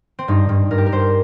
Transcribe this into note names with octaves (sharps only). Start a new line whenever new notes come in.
C4
G2 D#4
G2
G2 A#4
G4
A#4
G2 C5